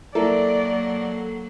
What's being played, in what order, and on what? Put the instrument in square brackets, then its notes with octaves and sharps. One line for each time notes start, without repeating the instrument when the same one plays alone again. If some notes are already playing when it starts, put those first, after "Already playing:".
[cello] F#3 A#3 [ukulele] E4 A#4 [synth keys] A4 [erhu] D5